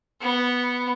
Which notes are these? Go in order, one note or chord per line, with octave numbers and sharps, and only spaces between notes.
B3